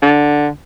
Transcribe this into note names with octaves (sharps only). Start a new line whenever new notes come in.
D3